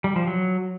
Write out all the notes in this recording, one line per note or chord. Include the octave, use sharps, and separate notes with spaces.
G3
F3
F#3